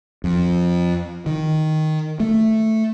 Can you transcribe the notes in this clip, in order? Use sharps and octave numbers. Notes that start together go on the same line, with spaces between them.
F2
D#3
A3